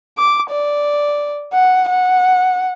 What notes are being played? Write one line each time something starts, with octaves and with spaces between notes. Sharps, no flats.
D6
D5
F#5
F#5